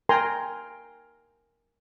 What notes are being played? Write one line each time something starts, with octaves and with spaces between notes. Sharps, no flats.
A#4 G5 G#5 A#5 C6